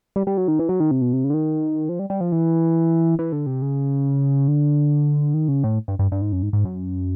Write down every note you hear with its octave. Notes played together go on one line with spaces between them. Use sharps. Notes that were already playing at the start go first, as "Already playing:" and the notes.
G3
G3
F#3
D#3
E3
F#3
D#3
C3
B2
C3
C#3
D3
D#3
F3
G3
G3
F3
E3
E3
D3
C3
C#3
D3
D#3
C#3
A2
G2
G2
G2
G#2
F#2
G#2
G#2
F#2